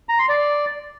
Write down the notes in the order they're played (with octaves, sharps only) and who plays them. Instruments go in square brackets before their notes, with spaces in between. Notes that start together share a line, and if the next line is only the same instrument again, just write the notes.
[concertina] A#5
C6
D5